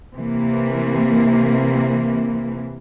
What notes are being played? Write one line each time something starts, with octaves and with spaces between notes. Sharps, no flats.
C3 E3 A#3